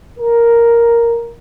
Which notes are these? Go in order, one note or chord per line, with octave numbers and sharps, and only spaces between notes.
A#4